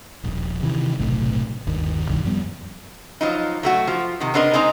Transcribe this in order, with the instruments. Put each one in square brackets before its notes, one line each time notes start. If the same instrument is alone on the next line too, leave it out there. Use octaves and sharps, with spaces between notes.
[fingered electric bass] D#1 A#1
C3 D#3 E3
F#1 B1 A2 C3
G1 D#2
D1 B1 G2 D#3
F#2 F3 G3 B3
[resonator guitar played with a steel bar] F3 F#3 D#4
F#3 A3 F#4
F3
C3 D#3
B3 C4 D4 A#4 D#5
G#3 C4 D#4 A#5